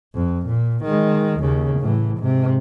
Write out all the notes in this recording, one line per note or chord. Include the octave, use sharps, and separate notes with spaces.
F2
A#2
D#3 G#3
D#2 C#3
A2 E3
G#2 C3